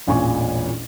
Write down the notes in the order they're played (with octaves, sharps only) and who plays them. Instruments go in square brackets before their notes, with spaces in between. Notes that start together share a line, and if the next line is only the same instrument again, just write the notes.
[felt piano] E1 A1 A#2 G#5 C#6